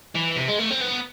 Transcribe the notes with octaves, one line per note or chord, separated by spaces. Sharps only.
E3
C3
G#3
A3
C4
B3